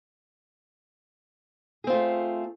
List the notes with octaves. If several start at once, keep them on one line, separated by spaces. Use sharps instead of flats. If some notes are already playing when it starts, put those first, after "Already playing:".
A3 C4 F4 G#4